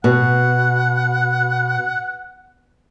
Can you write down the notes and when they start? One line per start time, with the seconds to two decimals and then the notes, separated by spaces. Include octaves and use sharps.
0.04 B2 F#5